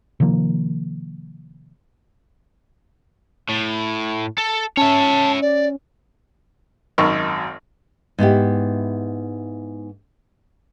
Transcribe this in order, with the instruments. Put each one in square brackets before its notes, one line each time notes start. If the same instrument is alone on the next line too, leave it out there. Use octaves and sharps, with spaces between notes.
[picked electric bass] C3 D#3 F3 A#3
[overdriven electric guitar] A2
A4
[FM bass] C#4 [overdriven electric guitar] C#5 E5 [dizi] A5
[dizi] D5
[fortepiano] G#1 F#2 D#3 D#4 C#6 E6
[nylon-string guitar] G#2 B3 E4 G4